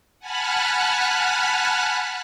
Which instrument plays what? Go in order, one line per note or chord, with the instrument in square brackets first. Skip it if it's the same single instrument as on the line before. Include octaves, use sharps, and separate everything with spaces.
[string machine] F#5 G#5 A5 B5 F6 F#6